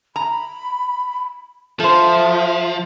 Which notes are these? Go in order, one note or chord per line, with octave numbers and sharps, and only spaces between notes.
A#5 B5
F3 A4 C5 E5